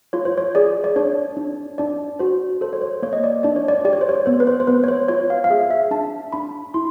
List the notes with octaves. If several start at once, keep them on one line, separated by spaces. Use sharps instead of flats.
F4 C#5
C5
C#5
G#4 D5
D5
D4 C#5
D4
D4 D5
F#4 C5
A4 C5
C#5
C5
A#3 C#5
D#5
D5
D4 D5
C#5
D5
G4 D5
C#5
C5
C#5
B3 C5
B4
C5
C5
B3 B4
C#5
C5
F4 C#5
F5
F5
G#4 E5
E5
D4 A5
D4 B5
E4 C6